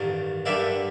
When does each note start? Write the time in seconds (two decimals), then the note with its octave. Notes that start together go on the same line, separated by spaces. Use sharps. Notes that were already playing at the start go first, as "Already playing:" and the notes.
Already playing: A1 G2 D#3
0.46 G2 D3 G3 A#3 D5 E5